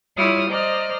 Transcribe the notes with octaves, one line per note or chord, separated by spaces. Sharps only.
G3 E4 F4 C#5 D#6 F6
C5 D5 D#5 A#5 F6